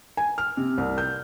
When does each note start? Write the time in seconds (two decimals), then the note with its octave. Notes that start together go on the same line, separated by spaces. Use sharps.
0.17 G#5
0.38 F6
0.57 C3
0.78 C2
0.98 G6